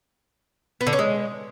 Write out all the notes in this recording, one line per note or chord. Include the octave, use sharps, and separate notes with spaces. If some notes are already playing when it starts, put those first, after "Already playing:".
B3
D3
C#4
G#3